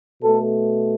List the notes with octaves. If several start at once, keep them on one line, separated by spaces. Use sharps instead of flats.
B2 A3 A4